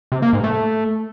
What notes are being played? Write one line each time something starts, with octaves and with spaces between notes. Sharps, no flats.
C3
A#3
G#2
A3